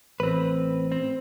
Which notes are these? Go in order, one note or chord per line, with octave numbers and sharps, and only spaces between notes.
A1 C4 B4
C4